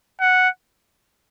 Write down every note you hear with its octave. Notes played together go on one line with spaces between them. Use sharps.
F#5